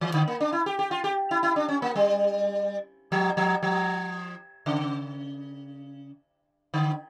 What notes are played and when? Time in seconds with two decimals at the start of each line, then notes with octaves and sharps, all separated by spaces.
0.01 E3
0.14 D3
0.28 A#3
0.40 D4
0.53 E4
0.66 G4
0.79 G4
0.91 F4
1.04 G4
1.31 E4
1.43 E4
1.56 D4
1.68 C#4
1.82 A#3
1.96 G3
3.12 F3
3.37 F3
3.63 F3
4.66 C#3
6.74 D3